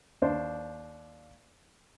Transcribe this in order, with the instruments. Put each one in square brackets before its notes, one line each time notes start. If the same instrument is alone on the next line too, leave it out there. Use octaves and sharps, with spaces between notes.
[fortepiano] D#2 D4 C5